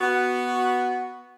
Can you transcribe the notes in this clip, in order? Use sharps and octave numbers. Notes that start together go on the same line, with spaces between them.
B3 F#4